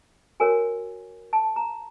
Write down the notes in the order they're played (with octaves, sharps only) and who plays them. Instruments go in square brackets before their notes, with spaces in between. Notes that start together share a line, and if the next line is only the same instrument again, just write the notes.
[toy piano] F#4 A#4 C#5 G#5
A5
A#5